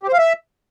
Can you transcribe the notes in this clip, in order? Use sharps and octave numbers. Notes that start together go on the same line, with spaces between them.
G4
C5
F5
E5